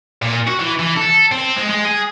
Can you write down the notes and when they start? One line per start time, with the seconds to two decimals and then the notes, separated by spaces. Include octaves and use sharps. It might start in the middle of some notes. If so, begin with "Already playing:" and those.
0.22 A#2
0.47 F#4
0.60 E3
0.79 E3
0.96 A4
1.31 C4
1.56 G#3
1.69 G#3
1.85 G#4